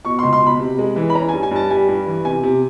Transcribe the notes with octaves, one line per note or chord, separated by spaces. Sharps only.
B2 C#6
C#2 C6
C6
B2 B5
C3
G#3
E3
B5
C#4 A#5
G2 G#5
G#5
G2 A5
G3 G#5
G2
E3
C3 G#5
C3